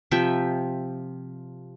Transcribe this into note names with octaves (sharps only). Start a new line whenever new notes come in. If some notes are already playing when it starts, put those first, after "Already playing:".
C3 F3 E5 G5